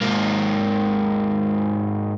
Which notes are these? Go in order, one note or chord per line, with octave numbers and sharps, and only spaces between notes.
G#2 A#3